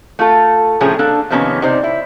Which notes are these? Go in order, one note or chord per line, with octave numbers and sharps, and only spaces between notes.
A3 F4 A4
A2 C3 F3 C#4 G#4 A#5
A#3 D4 A4
C3 D#3 F3 A#3 B3 C#4
C3 D#4 C5 D5
E4